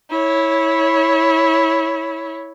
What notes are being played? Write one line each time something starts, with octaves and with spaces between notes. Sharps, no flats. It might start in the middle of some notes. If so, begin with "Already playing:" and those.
E4 C#5